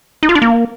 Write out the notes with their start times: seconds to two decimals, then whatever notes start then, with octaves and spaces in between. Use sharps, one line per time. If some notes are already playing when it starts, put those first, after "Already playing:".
0.23 D#4
0.29 F4
0.35 D4
0.42 A#3